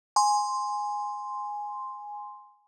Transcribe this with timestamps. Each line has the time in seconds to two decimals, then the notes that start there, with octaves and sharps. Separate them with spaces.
0.16 G#5 C6